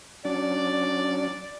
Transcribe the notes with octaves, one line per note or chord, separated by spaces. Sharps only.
F#3 C#4 D4 D5